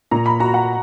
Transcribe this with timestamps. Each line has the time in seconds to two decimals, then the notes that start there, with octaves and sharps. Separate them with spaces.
0.11 A#2 A#5
0.26 B5
0.40 F#4 A#5
0.54 F#5